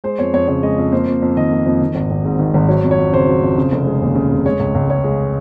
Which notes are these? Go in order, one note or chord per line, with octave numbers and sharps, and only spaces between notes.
G#3 C5
F2 C#5
F2 C#5
C#3 C#5
G#3 D#5
F2
A#3 C5
F2
F2
D#3 D#5
A#3
F2
D#3
G#1
G#1
G#2
D#3
G#1
F#3 C#5
F2
C#5
F2
C#3 C5
F#3
F2
C#3
F1
G#3
D#2
C#3
F1
G#3 C#5
C#2
C#2
C#3 C#5
G#3